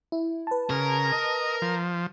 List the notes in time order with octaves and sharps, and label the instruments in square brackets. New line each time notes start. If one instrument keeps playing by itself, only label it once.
[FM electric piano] E4
B4 A5
[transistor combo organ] C#3 [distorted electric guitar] A#4
[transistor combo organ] D#5
F3